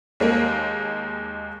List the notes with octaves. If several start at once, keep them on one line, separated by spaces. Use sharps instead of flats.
D#2 G#3 A#3